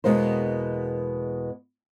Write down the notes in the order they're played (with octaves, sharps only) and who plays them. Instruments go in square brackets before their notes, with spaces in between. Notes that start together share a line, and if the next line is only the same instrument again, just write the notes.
[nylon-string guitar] E2 B2 G#3 A#3 C5